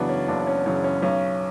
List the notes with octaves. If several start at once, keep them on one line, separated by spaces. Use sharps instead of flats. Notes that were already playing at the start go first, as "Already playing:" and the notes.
Already playing: F#1 F#2 C#3 E3 B3 D4 F#4
C#4
F#1 D4
C#4
F#2 C#3 E3 C#4
C#4
B1 C#4